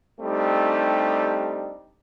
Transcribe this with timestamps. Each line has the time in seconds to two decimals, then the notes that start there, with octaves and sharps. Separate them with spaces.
0.21 G3 A3 C4 D4 D#4 G4